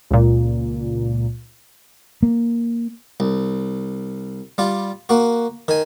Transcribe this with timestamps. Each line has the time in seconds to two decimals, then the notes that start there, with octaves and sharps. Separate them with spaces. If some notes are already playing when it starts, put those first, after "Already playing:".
0.11 C#2 A#2
2.23 A#3
3.20 C2
4.58 G3 F4
5.09 A#3 F#4
5.68 D#3 G#5